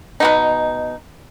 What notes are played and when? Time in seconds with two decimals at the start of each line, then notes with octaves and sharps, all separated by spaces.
0.20 B2 B3 D#4